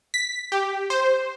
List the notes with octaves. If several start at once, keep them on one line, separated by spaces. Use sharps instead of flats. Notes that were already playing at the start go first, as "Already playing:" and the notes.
B6
G4
C5